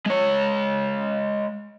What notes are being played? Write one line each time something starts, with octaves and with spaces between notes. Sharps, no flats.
G#3 C#5